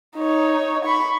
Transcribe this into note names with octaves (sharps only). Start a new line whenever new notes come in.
D#4 C#5
B5 C#6